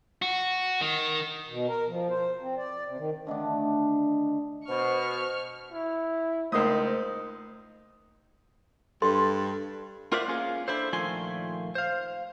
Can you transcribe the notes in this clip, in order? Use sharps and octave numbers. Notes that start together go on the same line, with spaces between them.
F#4
D#3
B2
A#4
F3
C5
C4
D5
C3
D#3
D3 D#3 A3 D4
B2 C5 C#6 F6
E4
C#2 A3 A#3 D#4 A#4 C5 D#6
G2 A4 C6
F4 A#4 C5 D5 E5 F#5
A#3 C#4 F4 G#4
D4 E4 A4 C5
A#2 D#3 F3 A3 G#5 C6
C5 F5